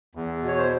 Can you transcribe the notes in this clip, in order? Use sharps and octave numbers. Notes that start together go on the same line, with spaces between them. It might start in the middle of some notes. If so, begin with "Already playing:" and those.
E2
B2
C#5
C5